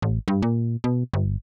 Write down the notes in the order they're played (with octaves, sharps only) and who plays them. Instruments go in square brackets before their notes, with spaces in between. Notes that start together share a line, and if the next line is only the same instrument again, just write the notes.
[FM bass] A1
G2
A#2
B2
G1